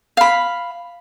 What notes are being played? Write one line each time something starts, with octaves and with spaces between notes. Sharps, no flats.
F5 B5